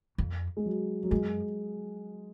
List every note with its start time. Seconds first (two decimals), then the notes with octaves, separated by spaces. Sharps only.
0.18 F2
0.57 G#3
0.65 F#3
1.03 F#3
1.11 F#2 G#3